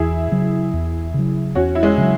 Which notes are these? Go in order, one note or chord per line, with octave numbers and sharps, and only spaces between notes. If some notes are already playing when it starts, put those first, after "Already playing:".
Already playing: E2 E4 G#4
C#3 F#3
E2
C#3 F#3
E2 C#4 F#4
E4
G#3 C#4
C#3 F#3